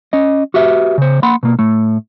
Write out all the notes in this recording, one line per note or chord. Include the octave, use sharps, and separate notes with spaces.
C#4 D#5
F#4 G4 B4 E5
C#3 C5
A#3 F#5 B5 C6
B2 A#3
A2 A3